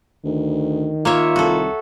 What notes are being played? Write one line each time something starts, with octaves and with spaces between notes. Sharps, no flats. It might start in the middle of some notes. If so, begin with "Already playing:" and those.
D2 D#3
A#3 F4 C#5 E5
C2 F#4 A4